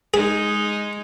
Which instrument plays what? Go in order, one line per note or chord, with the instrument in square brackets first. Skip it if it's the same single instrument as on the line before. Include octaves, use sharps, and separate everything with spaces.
[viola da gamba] G#3 D#4 [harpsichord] G#4